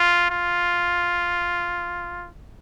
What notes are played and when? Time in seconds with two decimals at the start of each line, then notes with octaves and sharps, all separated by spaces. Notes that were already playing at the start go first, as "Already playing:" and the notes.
Already playing: F4
0.30 F4